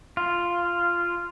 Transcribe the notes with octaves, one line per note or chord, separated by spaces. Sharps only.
F4